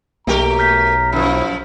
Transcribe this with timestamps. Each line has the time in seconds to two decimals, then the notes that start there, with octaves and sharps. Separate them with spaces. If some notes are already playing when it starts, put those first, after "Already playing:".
0.27 B1 A3 A#3 G4 A#4 A#5
0.59 F6 G6 B6
1.13 F#2 F3 E4